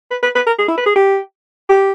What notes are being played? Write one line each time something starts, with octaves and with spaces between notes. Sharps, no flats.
B4
B4
B4
A#4
G#4
E4
B4
G#4
G4
G4